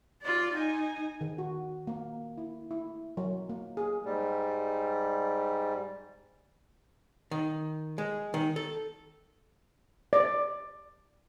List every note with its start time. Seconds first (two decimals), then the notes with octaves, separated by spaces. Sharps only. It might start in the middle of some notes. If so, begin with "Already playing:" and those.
0.22 F4 D5
0.53 D#4 G#5
1.21 D#3
1.38 F#4
1.87 A#3
2.38 E4
2.71 E4
3.17 F#3
3.49 A#3
3.77 G#4
4.05 G#2 G3
7.31 D#3
7.98 G#3
8.34 D#3
8.56 A4
10.13 D5